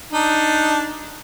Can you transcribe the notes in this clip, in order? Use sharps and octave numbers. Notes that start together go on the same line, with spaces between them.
D4 D#4